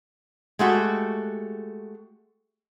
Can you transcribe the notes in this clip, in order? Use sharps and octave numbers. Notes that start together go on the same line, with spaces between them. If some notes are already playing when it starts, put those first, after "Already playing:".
G#3 A3 F#4 G4